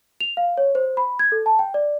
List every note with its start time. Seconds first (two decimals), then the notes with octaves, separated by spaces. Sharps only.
0.20 F7
0.37 F5
0.57 C#5
0.75 C5
0.97 B5
1.19 G#6
1.32 A4
1.46 A5
1.59 G5
1.74 D5